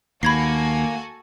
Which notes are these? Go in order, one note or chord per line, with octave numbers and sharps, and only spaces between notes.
D#2 A#3 F#4 A4 G#5 B5 G#6 C7